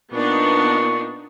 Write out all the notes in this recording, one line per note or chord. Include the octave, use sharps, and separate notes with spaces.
A#2 B3 D4 D#4 C#6